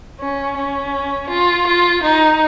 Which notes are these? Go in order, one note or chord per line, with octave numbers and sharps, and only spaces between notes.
C#4
C#4
F4
F4
D#4